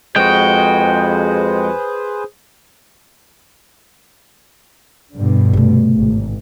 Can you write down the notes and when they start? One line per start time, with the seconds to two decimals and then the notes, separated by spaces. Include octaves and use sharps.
0.16 F2 G#3 F#4 G#4 B4 C5 G5
5.17 G2 B2 D3
5.53 C3 A3
5.96 G#1